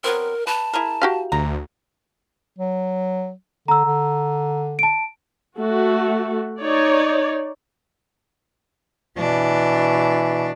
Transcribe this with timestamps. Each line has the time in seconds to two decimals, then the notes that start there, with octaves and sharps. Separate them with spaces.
0.04 F#3 B3 C4 A#4
0.47 B4 A5
0.73 E4 G#4 A#4
1.02 F#4 G4 F5
1.32 D2 A#5
2.59 F#3
3.68 D3 A#5 E6
3.85 D3
4.79 A5 D7
5.59 A3 F#4
6.62 D#4 C#5 D5
9.18 B2 E3 D4